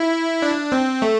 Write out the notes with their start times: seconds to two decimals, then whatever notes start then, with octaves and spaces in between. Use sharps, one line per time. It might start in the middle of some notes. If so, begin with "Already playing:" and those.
Already playing: E4
0.42 D4
0.72 C4
1.02 A3